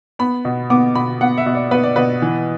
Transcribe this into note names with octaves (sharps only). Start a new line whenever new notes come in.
B3 B5
B2
B3 D6
B2 B5
B3 F#5
E5
B2
D5
B3 B4
D5
B2 B4
E3